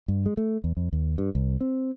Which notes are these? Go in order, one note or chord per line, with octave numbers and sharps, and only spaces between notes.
G2
G#3
A3
E2
F2
D#2
G2
C2
C4